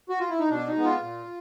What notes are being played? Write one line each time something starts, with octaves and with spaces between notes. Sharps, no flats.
F#4
F4
E4
D#4
B2 D4
D#4
G#3 B3
F4
A#2